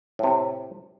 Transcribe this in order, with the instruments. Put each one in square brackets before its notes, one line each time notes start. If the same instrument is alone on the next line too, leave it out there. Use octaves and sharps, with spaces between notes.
[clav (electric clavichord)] A2 C3